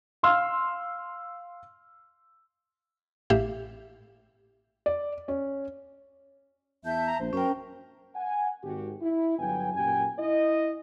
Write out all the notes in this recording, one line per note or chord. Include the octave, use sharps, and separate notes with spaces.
F5 C6 E6 F6
A1 A2 G4 E5 F5
D5
C#4
E2 E5 A5 G6
A#5
A#1 C5
F#2 C#4 A#4 G5
F#5 G#5
G#1 F#4 G4
E4
G1 F#3 B3 G5 G#5
F#2 A#2 G4 G5 G#5
E4 D#5